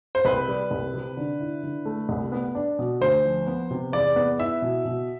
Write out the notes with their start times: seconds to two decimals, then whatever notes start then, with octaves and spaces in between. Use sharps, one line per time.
0.15 C5
0.25 C2 B4
0.48 G3
0.71 C2
0.94 C3
1.17 D3
1.40 E4
1.63 D3
1.85 A3
2.09 C2
2.32 B3
2.55 D4
2.79 B2
3.01 D2 C5
3.24 F3
3.47 B3
3.71 C3
3.93 E2 D5
4.16 B3
4.39 E4 E5
4.62 B2
4.85 B2